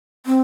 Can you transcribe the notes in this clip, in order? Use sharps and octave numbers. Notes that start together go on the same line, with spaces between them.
C4